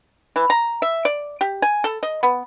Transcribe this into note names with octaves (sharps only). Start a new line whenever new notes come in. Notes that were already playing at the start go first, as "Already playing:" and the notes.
E3
A#5
E5
D5
G4
G#5
A4
D#5
B3